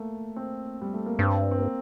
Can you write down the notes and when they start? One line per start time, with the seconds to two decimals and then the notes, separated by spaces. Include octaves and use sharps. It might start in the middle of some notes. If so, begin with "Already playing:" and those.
Already playing: A3 A#3
0.36 C4
0.82 G3
0.94 A3
1.06 A#3
1.19 G2 C4
1.51 C4
1.59 A#3